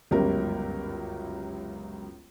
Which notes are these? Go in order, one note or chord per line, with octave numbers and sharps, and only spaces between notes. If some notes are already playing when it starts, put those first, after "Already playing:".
G1 C#2 F#2 G4 A#4